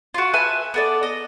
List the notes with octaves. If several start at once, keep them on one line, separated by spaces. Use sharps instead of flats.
F4 F#4
B4 E5 G#5 A5
B3 A4 D5
D#5